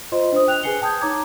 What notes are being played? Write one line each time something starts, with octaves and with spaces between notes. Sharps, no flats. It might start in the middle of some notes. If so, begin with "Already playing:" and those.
F4 C5 D#5 C6
D4 C5 D#6
G5 F#6 F7
G#4 B4 G#5 C7 C#7 G7
G5 A5 D#6 G6 G#6
D#4 C#5 A#5 D6 G#6